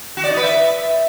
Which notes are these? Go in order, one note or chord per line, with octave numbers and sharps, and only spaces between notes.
F#4
D5
D#4
B4
E5